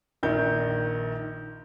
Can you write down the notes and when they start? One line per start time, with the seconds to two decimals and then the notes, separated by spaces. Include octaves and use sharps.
0.23 A#1 D#3 G6